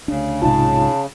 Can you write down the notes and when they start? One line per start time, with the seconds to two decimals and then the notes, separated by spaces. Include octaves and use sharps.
0.08 D2 C#3 D4
0.42 B1 G#2 C3 D#4 F4 A5